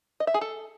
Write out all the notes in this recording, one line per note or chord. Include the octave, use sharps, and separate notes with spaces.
D#5
E5
G#4
A4